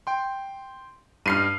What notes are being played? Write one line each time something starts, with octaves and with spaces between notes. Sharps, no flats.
G5 C6
G2 F6 C7 D#7